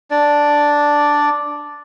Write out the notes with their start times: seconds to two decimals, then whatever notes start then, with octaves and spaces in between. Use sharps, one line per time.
0.11 D4 D5